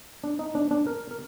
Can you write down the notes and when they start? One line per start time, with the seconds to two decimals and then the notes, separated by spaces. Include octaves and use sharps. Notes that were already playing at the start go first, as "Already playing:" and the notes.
0.24 D4
0.39 D#4
0.55 D4
0.71 D4
0.87 A#4
1.11 A#4